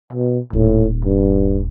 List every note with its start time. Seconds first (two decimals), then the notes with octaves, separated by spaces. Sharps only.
0.13 B2
0.53 D#1 A2
1.05 G2